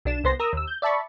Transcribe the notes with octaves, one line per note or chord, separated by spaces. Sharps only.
B1 D4 E7
C2 B3 C5 C6 A#6
A#4 A#5 D#6 E6
D#2 E6
G6
D5 E5 A5 B5 C#6